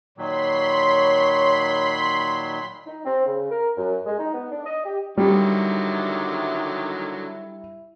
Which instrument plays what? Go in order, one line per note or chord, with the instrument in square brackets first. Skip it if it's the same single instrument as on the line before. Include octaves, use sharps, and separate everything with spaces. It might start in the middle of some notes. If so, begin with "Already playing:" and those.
[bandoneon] A#2 D#3 F#3 [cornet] C#5 [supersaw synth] B5 C6 B6
[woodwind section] D#4
C4
C#3
A#4
F#2
G#3
D#4
B3
D4
D#5
G4
[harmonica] D3 D#3 F#3 [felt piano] G3 [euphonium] E4